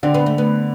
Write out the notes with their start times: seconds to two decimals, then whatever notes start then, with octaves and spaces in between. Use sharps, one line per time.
0.03 D3 C4 D4
0.14 B3
0.26 A3
0.38 B3